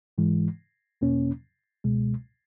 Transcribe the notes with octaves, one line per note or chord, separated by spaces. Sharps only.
G#2 E3 G#3
E2 B2 A#3 C#4
C#2 B2 G#3